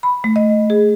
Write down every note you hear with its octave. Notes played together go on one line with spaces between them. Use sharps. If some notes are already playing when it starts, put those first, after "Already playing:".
B5
A3
D#5
G#4